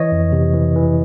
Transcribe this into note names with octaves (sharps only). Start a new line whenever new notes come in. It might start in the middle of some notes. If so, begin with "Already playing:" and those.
Already playing: E3 C#5 D#5
F2
C3
E3
E3